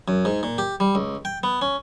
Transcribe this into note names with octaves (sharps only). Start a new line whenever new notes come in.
F#2
G#2
A#2
G4
G3
C#2
G5
B3
C#4